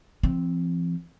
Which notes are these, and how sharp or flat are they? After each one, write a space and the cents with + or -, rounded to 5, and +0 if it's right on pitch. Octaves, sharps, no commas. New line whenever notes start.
F3 -45 C4 +0